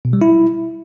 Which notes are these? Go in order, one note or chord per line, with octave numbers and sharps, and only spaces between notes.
B2
G3
E4